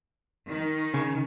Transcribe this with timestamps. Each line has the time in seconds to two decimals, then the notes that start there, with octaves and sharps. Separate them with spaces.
0.51 D#3
0.94 C#3